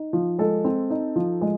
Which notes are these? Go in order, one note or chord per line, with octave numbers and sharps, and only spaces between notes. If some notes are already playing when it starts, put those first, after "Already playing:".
Already playing: D#4
F3
G#3 A4
C4
D#4
F3
G#3